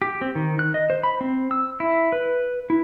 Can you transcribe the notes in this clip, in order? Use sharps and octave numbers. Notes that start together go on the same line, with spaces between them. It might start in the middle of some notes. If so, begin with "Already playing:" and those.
G4
C4
D#3
F#6
D#5
C5
B5
C4
E6
E4
B4
E4